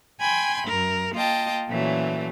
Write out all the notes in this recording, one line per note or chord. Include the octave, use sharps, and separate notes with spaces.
G5 G#5 B5 C6
F#2 A#4
A#3 F4 D#5 G5 A5
A#2 E3 F#3 A3 C#4